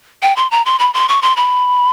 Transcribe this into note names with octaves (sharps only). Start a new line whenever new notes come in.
G5
C6
A#5
C6
B5
C6
C#6
C6
B5